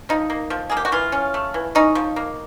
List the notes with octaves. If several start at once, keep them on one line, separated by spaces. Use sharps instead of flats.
F3 D#4
A#3
F3
A#3 G#4
G4
F#4
E3 F4
C#4
A3
E3
C#4 D#4
F3
A#3